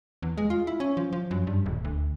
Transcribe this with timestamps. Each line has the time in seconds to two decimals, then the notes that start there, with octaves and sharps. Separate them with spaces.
0.22 E2
0.37 G#3
0.50 F4
0.67 E4
0.80 C#4
0.97 F3
1.13 F3
1.31 F#2
1.47 G2
1.66 D#1
1.85 D2